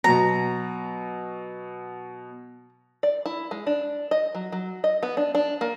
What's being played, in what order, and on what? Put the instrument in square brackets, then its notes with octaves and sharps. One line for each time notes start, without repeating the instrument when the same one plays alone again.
[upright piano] B2 F#3 [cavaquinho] A#5
[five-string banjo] D5
E4
G#3
D4
D#5
F#3
F#3
D#5
B3
D4
D4
A#3